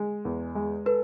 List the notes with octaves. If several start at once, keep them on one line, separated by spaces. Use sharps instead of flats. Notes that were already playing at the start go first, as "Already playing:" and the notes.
Already playing: G#3
E2
G#3
A4 B4